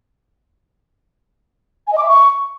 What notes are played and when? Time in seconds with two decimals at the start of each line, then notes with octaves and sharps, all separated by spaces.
1.87 G#5
1.92 D#5
1.98 D6
2.03 E5
2.08 C#6